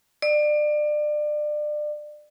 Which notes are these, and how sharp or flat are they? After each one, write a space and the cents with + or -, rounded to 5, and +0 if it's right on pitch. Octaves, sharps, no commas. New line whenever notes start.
D5 +30